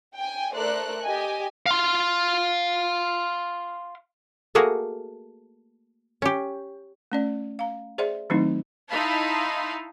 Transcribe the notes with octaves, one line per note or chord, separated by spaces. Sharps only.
G5 G#5
A3 A4 A#4 C5 D5 F#6
G4 D#5 G5 G#5
F5 C6
A3 A#3 F#4 G#4 A#4
C#4 G4
A3 C#4 D5
F5 A#5
G#4 C5 D5 E5 F#5 C6
D#3 F#3 A3 C4 D#4 E4
D#4 E4 F5 A5 B5 C6